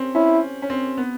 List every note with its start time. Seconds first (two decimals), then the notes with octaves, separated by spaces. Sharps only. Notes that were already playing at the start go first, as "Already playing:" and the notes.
Already playing: C4 C#4
0.15 C#4 E4
0.62 C#4
0.70 C4
0.97 B3